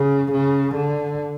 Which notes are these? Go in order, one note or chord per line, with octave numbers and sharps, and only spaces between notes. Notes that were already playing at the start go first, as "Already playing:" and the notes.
Already playing: C#3
C#3
D3